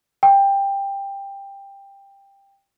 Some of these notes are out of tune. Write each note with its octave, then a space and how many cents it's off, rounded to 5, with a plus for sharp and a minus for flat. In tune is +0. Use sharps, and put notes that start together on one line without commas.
G5 +15